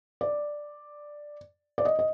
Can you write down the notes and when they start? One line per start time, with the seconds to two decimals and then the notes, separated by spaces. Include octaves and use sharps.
0.21 D5
1.78 D5
1.85 D#5
1.99 D#5